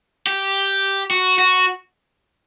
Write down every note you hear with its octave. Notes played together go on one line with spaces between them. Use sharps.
G4
F#4
F#4